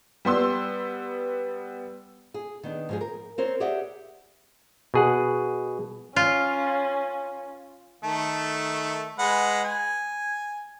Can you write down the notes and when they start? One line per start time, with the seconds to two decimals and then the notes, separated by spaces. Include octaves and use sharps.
0.25 G3 B3 C6 E6
2.34 G#4
2.63 D#3 B3 D4
2.89 G#2 F3 G#4
3.01 A#4
3.38 C4 A#4 C5 C#5
3.60 G4 G#4 D5 E5 F#5
4.94 B2 G#4 F#5
6.16 C#4 F4
8.03 D#3 A3 A4
9.19 G#3 B4 F#5
9.64 G#5